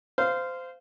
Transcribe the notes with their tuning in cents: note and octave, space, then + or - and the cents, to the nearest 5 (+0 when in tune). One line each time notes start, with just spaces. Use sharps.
C5 -20 F5 -10